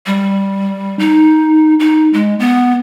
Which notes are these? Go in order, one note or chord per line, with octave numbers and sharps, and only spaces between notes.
G3
D#4
D#4
G#3
B3